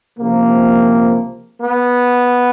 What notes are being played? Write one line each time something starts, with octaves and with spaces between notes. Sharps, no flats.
C#2 C3 F3 A#3
B3